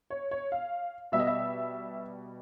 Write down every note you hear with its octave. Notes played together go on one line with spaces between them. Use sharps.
C#5
C#5
F5
B2 G3 E5
D#5
E5